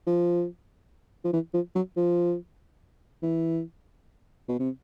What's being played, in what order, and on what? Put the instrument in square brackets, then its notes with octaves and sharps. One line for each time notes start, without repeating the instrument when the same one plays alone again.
[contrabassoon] F3
F3
E3
F3
F#3
F3
E3
B2
C3